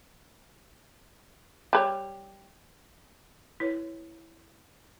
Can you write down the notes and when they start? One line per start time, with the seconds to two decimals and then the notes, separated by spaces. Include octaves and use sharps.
1.73 G3 B4 C#5
3.60 E4 B4 C#5